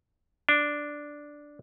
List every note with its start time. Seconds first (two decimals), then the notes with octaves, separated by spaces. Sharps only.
0.49 D4